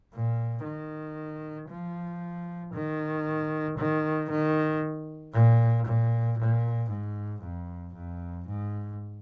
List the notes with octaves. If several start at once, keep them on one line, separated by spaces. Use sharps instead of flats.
A#2
D#3
F3
D#3
D#3
D#3
A#2
A#2
A#2
G#2
F2
F2
G#2